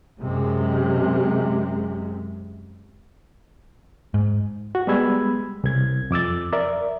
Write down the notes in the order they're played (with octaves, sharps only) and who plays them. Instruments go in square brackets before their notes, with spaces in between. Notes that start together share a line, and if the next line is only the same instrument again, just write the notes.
[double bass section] F#2 C3 G#3
[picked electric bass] G#2
[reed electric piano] F#4
G3 G#3 B3 B5 E6 G#6
C2 G#6
F2 D6 E6 A6
A#4 D5 E5